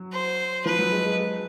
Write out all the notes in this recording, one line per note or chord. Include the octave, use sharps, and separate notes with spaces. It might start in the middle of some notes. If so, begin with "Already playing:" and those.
Already playing: F#3
C5
F3 B4
F#3
G#3
G#3
G#3